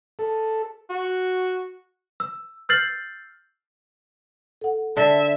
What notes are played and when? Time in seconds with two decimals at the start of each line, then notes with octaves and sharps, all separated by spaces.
0.19 A4
0.90 F#4
2.20 E6
2.69 E6 F6 G6 A6 C7 F#7
4.61 A4 F#5
4.97 D3 E5